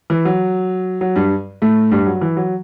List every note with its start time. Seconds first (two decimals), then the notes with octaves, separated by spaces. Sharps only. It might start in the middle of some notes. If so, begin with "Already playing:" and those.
0.10 E3
0.25 F#3
1.01 F#3
1.15 G2 G3
1.62 A2 A3
1.91 G2 G3
2.07 F#3
2.21 E3
2.37 F#3